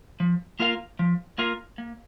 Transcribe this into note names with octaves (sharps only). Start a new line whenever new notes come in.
F3
A#3 F4 A#4 F5
F3
A#3 F4 A#4 F5
A#3